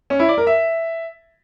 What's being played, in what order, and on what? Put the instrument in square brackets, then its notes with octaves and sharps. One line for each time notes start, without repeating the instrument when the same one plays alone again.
[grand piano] C#4
E4
D5
A#4
E5